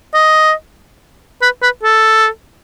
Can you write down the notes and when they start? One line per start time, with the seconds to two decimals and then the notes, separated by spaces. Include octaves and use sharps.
0.14 D#5
1.42 B4
1.62 B4
1.83 A4